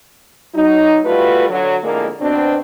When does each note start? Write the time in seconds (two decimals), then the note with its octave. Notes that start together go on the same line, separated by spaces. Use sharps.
0.55 F#3 D#4
1.04 G3 A3 F4 F#4 A4 B4
1.50 D3 F#3
1.83 F2 A2 D3 G#3 A#3
2.20 B2 C4 D4